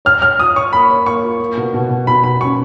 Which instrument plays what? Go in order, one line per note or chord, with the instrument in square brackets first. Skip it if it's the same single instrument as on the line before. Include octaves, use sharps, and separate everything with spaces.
[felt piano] C#5 [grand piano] F6
[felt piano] C#5 [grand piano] F6
[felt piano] F4 [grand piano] D#6
[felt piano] C#5 [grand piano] C#6
[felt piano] A#3 [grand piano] B5
[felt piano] C#5
[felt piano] A#3 [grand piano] C#6
[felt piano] F4
A#3
B2
B2
B2
[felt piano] B2 [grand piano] B5
[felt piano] B2 [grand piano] B5
[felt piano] C#4 [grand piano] C#6